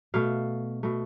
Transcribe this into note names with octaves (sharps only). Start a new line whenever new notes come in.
B2 A3 F5
B2 A3